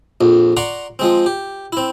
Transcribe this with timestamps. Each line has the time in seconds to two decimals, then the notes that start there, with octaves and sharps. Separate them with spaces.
0.21 A#1 F2
0.57 D5 F#5 A#5 C6 C#6
0.99 F3 G#3 C4
1.26 G4
1.73 C4 E4